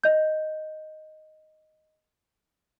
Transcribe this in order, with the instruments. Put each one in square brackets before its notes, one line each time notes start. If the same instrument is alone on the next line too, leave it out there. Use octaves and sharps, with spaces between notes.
[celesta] D#5 G6